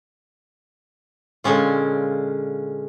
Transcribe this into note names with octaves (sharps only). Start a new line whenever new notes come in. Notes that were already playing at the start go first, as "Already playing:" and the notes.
A#2 D3 G#3 C#4 F4